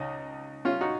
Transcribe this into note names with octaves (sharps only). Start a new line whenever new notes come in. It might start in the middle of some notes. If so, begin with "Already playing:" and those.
Already playing: C#2 C#3 D#4
C#4 F4
D#4 F#4